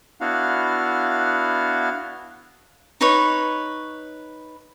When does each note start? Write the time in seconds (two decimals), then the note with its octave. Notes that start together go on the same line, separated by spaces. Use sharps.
0.21 B3 D4 E4 F#4 F5
3.01 D#4 B4 C#5